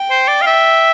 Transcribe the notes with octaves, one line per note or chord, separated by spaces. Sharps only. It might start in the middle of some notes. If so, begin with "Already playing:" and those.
Already playing: G5
C5
D5
F5
E5